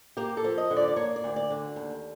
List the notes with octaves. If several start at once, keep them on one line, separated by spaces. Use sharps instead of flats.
A#3 G4
A4
F3
D#5
D3
D5
D5
A#3 C#5
D5
D2
D5
D3
D#2